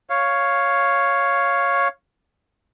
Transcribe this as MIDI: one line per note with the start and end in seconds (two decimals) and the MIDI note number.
0.10 1.88 73
0.10 1.88 77